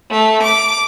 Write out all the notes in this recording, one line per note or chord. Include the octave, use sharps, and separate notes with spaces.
A3
D6